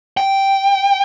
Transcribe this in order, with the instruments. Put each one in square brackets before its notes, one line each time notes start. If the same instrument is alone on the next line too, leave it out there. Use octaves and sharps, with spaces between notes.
[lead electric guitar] G5